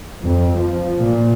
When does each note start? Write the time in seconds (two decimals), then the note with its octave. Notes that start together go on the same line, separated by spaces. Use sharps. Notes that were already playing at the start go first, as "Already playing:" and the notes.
0.23 F2
0.58 F3
0.99 A#2